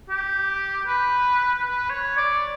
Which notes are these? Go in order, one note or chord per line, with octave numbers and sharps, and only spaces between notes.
G4
B4
B4
C#5
D5